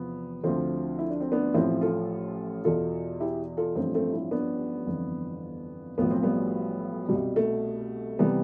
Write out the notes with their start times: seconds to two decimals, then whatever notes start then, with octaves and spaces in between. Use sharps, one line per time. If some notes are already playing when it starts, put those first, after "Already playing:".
Already playing: E2 C3 F3 B3
0.43 D2 D3 F3 A3 C4
0.99 E4
1.10 D4
1.20 C4
1.32 B3 D4
1.54 A1 A2 F3 C4 E4
1.81 F4 A4
2.64 E2 B2 F4 A4
3.20 E4 G4
3.57 F4 A4
3.75 A1 G2 F3 A3 C4
3.95 A3 C4
4.13 C4 E4
4.31 B3 D4
4.87 G1 F2 E3
5.98 B1 A2 F3 B3
6.11 C4
6.23 G3 B3
7.08 C2 B2 G3
7.36 A3
8.19 C3 E3 G3 B3